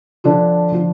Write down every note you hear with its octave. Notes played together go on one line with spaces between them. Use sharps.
D3 F3 D4 F4
F3 D4 F4